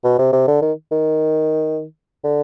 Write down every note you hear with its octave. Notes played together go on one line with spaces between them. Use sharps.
B2
C3
C3
D3
D#3
D#3
D3